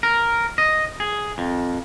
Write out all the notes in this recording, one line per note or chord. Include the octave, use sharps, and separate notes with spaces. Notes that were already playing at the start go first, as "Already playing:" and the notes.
A#4
D#5
G#4
F2